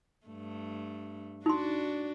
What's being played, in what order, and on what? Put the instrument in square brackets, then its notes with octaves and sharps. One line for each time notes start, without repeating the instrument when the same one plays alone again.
[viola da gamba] G2 A3
[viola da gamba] D4 F#4 D5 [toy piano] D#4 C6